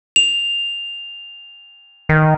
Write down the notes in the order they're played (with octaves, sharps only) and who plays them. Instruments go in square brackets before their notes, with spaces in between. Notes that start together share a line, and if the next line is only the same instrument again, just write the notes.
[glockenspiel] F7
[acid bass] D#3